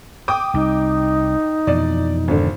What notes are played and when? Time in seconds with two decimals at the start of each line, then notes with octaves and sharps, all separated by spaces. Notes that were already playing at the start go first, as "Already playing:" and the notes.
0.28 G5 D6 D#6
0.54 C2 D#4
1.67 F2 B2 E3 D5
2.28 G#1 D3